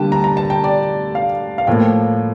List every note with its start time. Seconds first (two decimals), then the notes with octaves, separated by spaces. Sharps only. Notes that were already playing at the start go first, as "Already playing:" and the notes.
Already playing: D3 G3 A#3 G5 A5
0.12 A#5
0.24 A#5
0.37 A5
0.50 G5
0.64 D5
1.15 F5
1.58 F5
1.67 A2 F3 A#3 G5